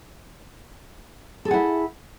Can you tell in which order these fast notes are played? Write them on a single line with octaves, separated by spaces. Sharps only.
A4 G#4 F#5 E4